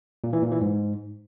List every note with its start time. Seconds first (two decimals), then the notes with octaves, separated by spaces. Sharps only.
0.24 A#2
0.33 E3
0.42 A#2
0.52 E3
0.61 G#2